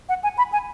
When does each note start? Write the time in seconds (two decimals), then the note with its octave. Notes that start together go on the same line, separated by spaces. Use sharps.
0.09 F#5
0.23 G#5
0.38 B5
0.52 G#5